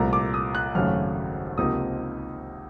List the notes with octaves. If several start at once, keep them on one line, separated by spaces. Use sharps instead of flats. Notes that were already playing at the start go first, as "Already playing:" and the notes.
Already playing: C2 A#2 F3 A3 A#5
D6
D#6
F#6
G#1 F#2 C#3 F#3 A3 F6
C#2 C3 F3 A#3 D#4 D#6